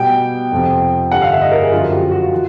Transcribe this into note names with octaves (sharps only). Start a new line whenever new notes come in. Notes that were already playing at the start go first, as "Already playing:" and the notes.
Already playing: B2 G3 G5
F2 C3 F3
G2 D3 G3 F#5
F5
E5
D#5
A#4
G#4
F#2 D3 F3 F4
F#4
G4
F#4
F#4
F4
E3